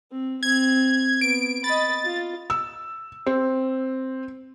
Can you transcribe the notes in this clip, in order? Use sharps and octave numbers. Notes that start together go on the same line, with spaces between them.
C4
C4 G#6
B3 D7
D#5 B5 A6
F4
E6
C4